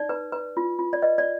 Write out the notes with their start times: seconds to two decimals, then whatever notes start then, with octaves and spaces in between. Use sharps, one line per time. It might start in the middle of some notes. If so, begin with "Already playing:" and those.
Already playing: D#4 D5
0.09 B4
0.32 B4
0.57 F4
0.79 F4
0.93 D5
1.02 B4 D#5
1.18 D5